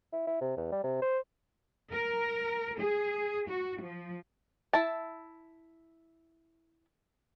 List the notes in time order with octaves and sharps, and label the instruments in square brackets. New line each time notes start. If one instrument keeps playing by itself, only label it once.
[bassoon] E4
E4
C3
E2
G3
C3
C5
[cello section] A#4
G#4
F#4
F3
[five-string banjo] E4 A5